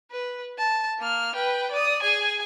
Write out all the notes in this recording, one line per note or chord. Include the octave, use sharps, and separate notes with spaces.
B4
A5
A#3 F6
B4 G5
D5 D#6
G#4 G#5